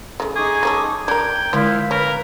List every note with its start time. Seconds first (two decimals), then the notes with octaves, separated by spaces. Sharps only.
0.20 C#3 A3
0.36 D#4 G#4 C#6 D6
0.63 A3 C#4 A4
1.08 D4 A#4 G5 G#6
1.53 D3 F3 G#3 E4 C5 F5
1.91 C#4 A#4 B4 F5 B5